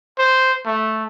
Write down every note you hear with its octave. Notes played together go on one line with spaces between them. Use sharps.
C5
A3